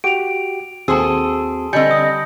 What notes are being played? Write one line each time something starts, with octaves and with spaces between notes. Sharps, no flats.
F#4 G4 D7 F7
D#2 C4 F#4 G#4 A4 A5 C6 E6
D3 G3 C4 D#5 G#5 G6 C#7
D#6